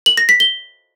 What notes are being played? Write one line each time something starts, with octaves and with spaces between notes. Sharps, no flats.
F#7
A#6
B6
G7